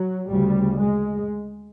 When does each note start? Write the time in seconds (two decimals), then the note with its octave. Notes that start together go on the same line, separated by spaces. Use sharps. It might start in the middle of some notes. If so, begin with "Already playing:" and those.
Already playing: F#3
0.30 D2 C#3 G3
0.77 G#3